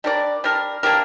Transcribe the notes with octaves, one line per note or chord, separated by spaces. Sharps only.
G3 D4 A#4 D5
G3 D4 A#4
A#3 D4 G4 A#4